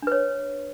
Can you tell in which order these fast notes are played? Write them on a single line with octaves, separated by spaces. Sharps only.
D4 B4 C#5